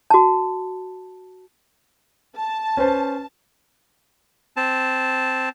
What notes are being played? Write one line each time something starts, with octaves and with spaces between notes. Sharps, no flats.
F#4 A5
A5
C#4 B4 C5
C4 A5